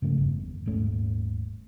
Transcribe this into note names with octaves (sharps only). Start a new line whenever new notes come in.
G2 C#3 F3 A3
G1 E2
D#1 G#2 A3 C#4